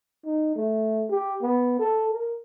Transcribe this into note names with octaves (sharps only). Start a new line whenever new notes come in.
D#4
A3
G4
B3
A4
A#4